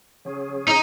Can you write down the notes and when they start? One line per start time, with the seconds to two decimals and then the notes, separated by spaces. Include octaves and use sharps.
0.25 C#3 F#3 C#4 G#4
0.68 D#4